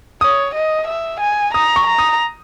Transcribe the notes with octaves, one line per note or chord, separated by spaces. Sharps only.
C#5 D#6
D#5
E5
G#5
A#5 D#6
C#6
A#5
D#6